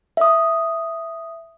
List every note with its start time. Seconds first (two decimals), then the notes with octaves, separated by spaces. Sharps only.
0.17 E5 D#6